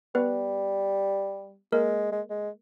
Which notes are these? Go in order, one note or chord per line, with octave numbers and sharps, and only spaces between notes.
G3 B3 B4
G#3 A#3 A#4
G#3
G#3